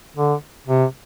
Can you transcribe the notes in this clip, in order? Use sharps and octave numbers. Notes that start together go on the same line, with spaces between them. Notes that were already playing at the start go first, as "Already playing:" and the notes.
D3
C3